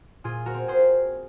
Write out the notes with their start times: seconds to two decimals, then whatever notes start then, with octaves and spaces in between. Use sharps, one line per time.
0.24 A#2 F4 G#4
0.46 F#4 A#4
0.54 C4
0.68 G#4 C5